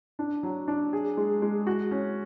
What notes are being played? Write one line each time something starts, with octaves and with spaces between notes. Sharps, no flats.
D4
F#3
D4
G#4
G#3
G#3
F#4
C#4